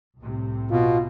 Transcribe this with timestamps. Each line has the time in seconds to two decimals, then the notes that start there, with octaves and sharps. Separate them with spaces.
0.19 C2 A2 C3
0.71 B2 F4